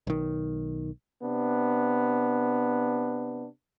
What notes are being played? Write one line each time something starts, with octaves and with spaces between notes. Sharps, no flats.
B1 D#3
C3 B3 D4